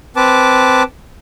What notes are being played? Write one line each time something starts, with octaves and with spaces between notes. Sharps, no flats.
C4 B4 A5 D6